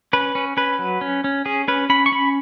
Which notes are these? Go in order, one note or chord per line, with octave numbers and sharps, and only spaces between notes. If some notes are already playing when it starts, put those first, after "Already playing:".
C#4 B4
C#4
C#4 B4
F#3
C#4
C#4
C#4 G#4
C#4 B4
C#4 B5
C#6
C#4 B5